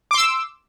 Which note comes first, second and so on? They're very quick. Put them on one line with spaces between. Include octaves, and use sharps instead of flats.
D6 C6 E6